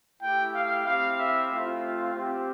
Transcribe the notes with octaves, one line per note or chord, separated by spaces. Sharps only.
A3 E4 G4 G5
F5
C4 E4 G4 F5
E5
A3 C4 F4
C4 G4